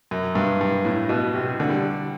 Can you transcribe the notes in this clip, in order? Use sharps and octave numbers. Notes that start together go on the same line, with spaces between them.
F#2
G2
G2
A2
B2
C3
D3
G3